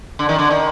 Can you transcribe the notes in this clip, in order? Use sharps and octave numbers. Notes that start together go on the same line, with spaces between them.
D3
D#3
D3
D#3